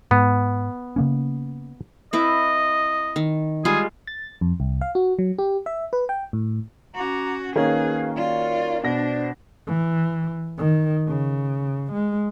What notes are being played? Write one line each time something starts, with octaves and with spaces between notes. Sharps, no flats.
G#2 B3
C#3 A#3 C#4
C4 E4 B4 D#5
D#3
G3 G#3 F4 G#4
A6
F2
C2
F5
F#4
F#3
G4
E5
B4
G5
A2
C#4 F#4 A#5 D6
D#3 A#3 C#4 F#4 G#4 B4 F5
F4 F#4 D5
B2 D4 C5 D5 A#6
E3
D#3
C#3
G#3